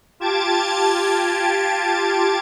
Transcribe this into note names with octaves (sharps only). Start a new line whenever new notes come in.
F4 G4 A5 G#6 A6 D7